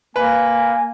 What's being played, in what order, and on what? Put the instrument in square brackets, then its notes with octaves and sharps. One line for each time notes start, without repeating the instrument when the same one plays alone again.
[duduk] A#3 [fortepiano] B4 [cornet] G#5